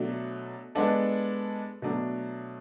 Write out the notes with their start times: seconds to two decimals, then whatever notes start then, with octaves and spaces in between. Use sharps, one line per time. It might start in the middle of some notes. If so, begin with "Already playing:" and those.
Already playing: B2 F#3 A3 D4
0.75 G#3 B3 D4 A4
1.82 B2 F#3 A3 D4